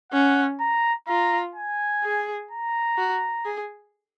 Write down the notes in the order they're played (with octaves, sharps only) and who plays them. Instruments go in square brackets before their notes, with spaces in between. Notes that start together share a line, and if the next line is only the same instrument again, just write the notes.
[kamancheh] C#4 [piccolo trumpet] F#5
[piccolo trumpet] A#5
[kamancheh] F4 [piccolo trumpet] A#5
[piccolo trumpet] G#5
[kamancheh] G#4
[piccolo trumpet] A#5
[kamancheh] F#4
G#4